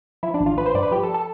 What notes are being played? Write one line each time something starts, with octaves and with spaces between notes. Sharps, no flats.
F3 E4
D4
A1
F4
A1 B4
C5
G2 D5
B4
F3 G4
A4
A4